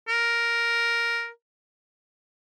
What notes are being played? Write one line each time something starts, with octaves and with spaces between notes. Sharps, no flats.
A#4